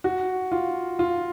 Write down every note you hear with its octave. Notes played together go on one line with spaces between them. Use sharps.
F#4
F4
F4